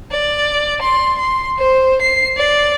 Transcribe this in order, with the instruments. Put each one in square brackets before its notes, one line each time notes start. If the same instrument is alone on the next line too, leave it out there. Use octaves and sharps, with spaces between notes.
[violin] D5
C6
C6
C5
C7
D5